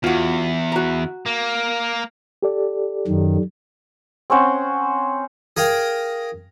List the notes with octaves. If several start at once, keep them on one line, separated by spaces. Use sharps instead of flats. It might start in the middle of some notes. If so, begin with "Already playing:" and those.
E2 F4 F#4
F#4 A#5
A#3
G4 A4 D5
F#2 D#3
C4 C#4 C5 F#5
G#4 A#4 F5 G5